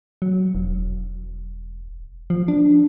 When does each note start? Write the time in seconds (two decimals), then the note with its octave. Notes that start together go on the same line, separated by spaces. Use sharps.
0.22 F#3
0.55 E1
2.30 F3
2.48 D4